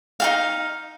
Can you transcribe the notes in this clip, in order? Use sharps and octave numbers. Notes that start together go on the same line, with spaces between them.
D#4 F#4 F5